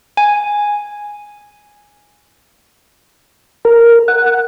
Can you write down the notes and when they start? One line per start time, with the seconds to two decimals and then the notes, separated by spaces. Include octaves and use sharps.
0.17 G#5
3.65 A#4
4.08 F#5